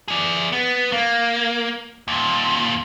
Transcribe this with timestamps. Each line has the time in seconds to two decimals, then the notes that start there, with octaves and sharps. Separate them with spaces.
0.08 G#4 D5
0.52 B3
0.92 A#3
2.08 D#2 A#2